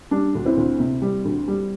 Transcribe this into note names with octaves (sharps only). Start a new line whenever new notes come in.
G3 D4
D2
C4 E4
D2
C3
G3
D2
G3